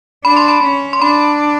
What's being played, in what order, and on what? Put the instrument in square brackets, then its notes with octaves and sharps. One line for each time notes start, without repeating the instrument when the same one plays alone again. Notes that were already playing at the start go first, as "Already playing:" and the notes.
[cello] D4 [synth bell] B5
[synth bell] C6
B5
[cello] C#4
[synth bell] C6
[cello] D4 [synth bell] B5